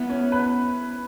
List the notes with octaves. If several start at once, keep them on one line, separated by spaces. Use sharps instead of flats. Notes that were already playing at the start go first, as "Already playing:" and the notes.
Already playing: B3 E4
C#4
B4